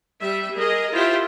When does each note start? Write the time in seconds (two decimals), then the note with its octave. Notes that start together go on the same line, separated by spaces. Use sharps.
0.20 G3 E5
0.56 G#4 A#4 D#5
0.92 E4 F4 G4 C5 E5